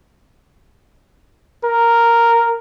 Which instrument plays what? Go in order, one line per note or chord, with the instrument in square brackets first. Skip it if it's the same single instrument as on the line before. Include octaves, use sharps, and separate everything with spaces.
[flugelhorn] A#4